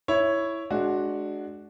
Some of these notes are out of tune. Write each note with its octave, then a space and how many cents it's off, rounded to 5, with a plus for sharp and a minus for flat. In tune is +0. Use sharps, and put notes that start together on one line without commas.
E4 +0 C#5 +0
G#3 +25 D4 +0 F#4 +0